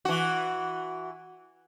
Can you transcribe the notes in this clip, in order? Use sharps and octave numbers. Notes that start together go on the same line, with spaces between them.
E3 F#4